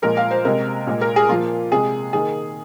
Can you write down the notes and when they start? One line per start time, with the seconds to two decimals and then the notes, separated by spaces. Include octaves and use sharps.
0.02 A#2 F3 G#3 A#4
0.17 F5
0.31 C5
0.45 C3 G#3 A#4
0.87 A#2 G#3
1.01 A#4
1.16 G#4
1.29 A#2 F3 A#3 F4
1.72 C3 G#3 G#4
2.13 D#3 A#3 G#4